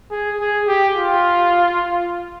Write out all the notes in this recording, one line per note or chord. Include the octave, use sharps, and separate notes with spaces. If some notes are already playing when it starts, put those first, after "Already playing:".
G#4
G#4
G4
F4